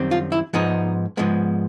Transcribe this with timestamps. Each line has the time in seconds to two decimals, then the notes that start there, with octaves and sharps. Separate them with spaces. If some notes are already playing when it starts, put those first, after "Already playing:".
Already playing: F#2 D#3 G3 C4
0.11 F4
0.32 E4
0.53 G#2 F3 G#3 B3 D#4
1.17 G#2 F3 G#3 B3